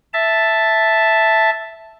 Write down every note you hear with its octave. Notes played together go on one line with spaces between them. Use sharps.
E5 A5